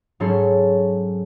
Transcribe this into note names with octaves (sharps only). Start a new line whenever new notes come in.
G#2 F#3 C#4 G#4 A4 C6